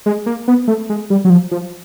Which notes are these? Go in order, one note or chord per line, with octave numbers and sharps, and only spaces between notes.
G#3
A#3
B3
A3
G#3
G3
F#3
F3
F3